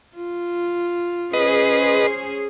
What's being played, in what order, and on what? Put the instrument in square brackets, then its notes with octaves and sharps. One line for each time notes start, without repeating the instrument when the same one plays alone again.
[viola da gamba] F4
[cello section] C#4 G#4 C5 [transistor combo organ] B4 D#5